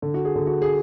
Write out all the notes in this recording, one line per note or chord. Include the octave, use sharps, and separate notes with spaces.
D3
F#4
G#4
D3
F#4
G#4